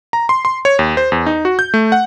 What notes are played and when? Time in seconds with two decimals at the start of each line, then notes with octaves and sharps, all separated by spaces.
0.13 A#5
0.29 C6
0.45 C6
0.65 C#5
0.79 D#2
0.97 C5
1.12 E2
1.26 D#4
1.45 F#4
1.59 G6
1.74 A3
1.92 F#5